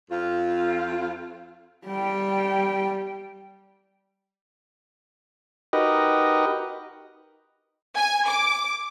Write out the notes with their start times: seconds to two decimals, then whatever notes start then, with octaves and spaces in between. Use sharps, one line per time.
0.11 F2 F4
1.86 G3 G5
5.73 D#4 F#4 G4 A#4 B4 D#5
7.96 G#5
8.28 D6